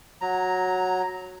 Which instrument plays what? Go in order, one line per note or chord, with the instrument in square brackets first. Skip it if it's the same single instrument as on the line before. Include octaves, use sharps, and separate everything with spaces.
[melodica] F#3 A#5